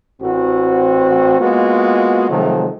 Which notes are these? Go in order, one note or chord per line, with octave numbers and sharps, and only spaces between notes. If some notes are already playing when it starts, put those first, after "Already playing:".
A1 C4 F#4
G#3 A#3 B3 F4 F#4
C3 D#3 F3 F#3 G#3 A3